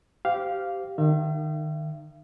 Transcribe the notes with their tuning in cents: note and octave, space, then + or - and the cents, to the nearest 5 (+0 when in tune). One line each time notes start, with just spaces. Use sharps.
G4 -15 C5 -30 F5 +0
D#3 -25 E5 +45